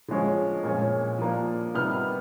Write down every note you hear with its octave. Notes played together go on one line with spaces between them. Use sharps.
D3 F3 G#3 C#4
A#2 F3 G#3 C#4
F3 A#3 D4
C3 D#3 G3 B3 F6